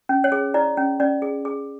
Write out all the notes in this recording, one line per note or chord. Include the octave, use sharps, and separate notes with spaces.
C#4
C#5
G#4
E4 D5
C#4
C#4 D5
G#4
G#4